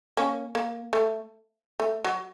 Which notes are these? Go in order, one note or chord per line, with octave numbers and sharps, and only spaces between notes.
A#3 C#4
A#3
A3
A3
F#3